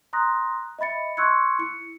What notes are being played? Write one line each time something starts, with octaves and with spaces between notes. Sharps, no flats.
A#5 C6 D#6 F#6 A#6
D#5 E5 B5 A6 C#7
C6 C#6 E6 F#6 G#6 C#7
E4 C#7